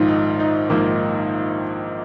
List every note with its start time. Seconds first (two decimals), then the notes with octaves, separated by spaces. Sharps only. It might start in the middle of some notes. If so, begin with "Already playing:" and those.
Already playing: A#1 G#2 D#3 F4
0.09 D#4
0.40 D#4
0.70 A#1 G#2 D#3 A#3